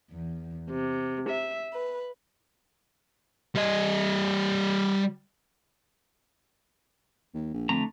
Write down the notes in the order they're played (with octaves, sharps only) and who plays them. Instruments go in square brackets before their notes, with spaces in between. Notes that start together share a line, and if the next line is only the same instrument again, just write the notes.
[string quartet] E2
C3
E5
B4
[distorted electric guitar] G3 D#5
[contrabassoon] D#2
A#1
[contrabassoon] F2 [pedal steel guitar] D3 A3 A#5